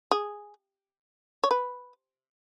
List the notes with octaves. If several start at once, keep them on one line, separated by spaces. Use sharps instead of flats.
G#4
C#5
B4